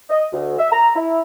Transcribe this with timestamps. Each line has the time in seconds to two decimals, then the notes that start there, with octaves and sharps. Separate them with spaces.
0.10 D#5
0.33 D2
0.59 E5
0.72 A#5
0.96 E4